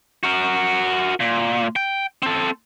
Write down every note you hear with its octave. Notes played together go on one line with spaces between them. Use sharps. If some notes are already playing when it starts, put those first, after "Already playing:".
F#4 A#4
A#2
G5
C4 A4